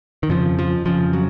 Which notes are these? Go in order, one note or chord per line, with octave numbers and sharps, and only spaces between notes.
D#3
F2 C#3 F3
F3
F2 C#3 F3
F#3